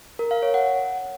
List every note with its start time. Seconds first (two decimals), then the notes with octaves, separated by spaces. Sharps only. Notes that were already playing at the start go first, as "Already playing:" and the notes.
0.19 A#4
0.31 F5
0.42 C#5
0.54 F#5